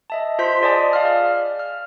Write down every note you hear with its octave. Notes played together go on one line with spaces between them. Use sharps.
D#5 E5 A5
F4 C5 C6 G6 B6
G#4 D5 D#5 G#5 A5
F5 F6
D5
F6